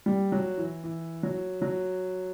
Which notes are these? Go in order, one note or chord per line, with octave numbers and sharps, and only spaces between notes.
G3
F#3
E3
E3
F#3
F#3